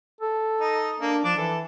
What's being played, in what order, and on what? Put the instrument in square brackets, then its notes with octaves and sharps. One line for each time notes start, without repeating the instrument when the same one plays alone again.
[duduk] A4
[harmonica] D#4 D#5
[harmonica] A#3 [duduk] D4
[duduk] F3 [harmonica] D4 A5 D6
[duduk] E3 [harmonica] A4